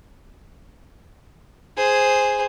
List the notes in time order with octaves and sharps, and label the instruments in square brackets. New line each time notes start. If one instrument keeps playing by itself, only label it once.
[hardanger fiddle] G#4 C5